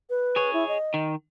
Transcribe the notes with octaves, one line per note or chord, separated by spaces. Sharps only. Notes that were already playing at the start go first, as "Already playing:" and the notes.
B4
G#4 C#5
E4
D#5
D#3